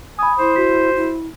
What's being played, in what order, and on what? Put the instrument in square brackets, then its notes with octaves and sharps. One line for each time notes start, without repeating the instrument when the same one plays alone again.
[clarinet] G#5 [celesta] B5 D#6
[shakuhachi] E4 [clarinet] C5
[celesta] F#4 B6
[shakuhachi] E4